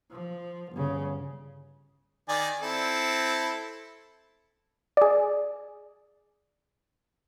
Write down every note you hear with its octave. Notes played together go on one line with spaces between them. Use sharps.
F3
G1 C#3
D#3 D5 G#5
C4 E4 A4
G#4 D5